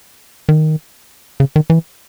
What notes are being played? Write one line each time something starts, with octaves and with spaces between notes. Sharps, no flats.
D#3
C#3
D#3
E3